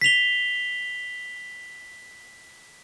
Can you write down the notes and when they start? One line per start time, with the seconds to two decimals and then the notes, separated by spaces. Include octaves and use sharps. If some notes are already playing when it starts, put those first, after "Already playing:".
0.01 B6 C7 F7 G7